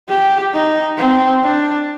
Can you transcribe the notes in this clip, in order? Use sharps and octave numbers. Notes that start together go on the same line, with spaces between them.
G4
D#4
C4
D4